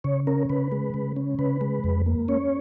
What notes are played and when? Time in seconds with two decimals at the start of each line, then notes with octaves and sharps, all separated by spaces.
0.04 C#3 C#5
0.27 C#4 A#4
0.50 C#3 B4
0.72 G#3
0.94 C#3
1.16 C#4
1.39 C#3 B4
1.61 G#3
1.84 F2
2.06 A#3
2.28 C#4 C#5